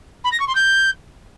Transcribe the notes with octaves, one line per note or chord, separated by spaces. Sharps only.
B5
A#6
C#6
C6
G6